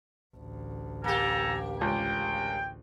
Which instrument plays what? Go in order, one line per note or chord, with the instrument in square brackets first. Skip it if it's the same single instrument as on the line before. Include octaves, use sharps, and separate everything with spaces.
[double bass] A1 D2
[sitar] A#3 G4 [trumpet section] A4 G#5 A#5
[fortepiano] C#2 [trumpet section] G5